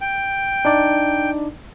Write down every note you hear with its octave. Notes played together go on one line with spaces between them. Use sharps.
G5
D4 D#4 D5